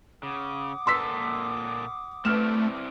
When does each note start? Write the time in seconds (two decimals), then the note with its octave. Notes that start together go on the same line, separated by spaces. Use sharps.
0.23 C#3 F#5 D6 D#6
0.87 A#2 A#3 A4 C6 E6 B6
2.25 A3 C4 E4 B4 D5 F6 E7